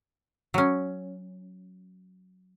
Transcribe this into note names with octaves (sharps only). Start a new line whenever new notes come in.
F#3 C#4